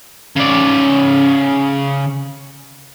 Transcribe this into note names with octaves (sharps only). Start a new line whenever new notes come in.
C#3 D5